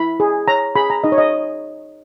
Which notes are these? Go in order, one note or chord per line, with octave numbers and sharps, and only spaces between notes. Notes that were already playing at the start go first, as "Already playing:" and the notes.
Already playing: E4 B5
G#4
C#5 A#5
G#4 B5
A#5
D#4 D#5
C#5
D#5